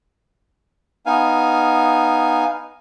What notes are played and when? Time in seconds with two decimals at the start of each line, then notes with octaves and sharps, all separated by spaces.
1.06 B3 D#4 F5 G#5